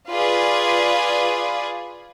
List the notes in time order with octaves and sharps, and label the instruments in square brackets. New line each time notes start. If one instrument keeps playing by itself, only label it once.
[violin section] F4 G#4 B4 D5